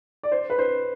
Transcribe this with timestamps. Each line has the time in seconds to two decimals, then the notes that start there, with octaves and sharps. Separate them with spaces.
0.23 D5
0.32 C5
0.50 B4
0.59 C5